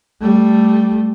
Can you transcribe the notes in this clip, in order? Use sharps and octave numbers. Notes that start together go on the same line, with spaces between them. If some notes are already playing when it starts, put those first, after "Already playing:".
G3 A3